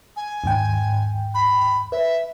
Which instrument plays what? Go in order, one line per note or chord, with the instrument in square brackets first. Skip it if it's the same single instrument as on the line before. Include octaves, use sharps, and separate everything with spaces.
[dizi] G#5
[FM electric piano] D#2 G#2 G5
[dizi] B5
[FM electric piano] B4 [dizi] E5